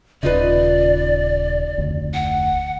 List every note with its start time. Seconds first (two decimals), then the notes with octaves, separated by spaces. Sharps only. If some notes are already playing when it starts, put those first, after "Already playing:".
0.23 D#1 C#3 D#4 F4 B4 D5
1.78 F1 D2
2.14 F#5